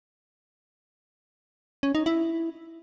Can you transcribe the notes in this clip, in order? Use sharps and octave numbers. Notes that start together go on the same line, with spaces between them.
C#4
D#4
E4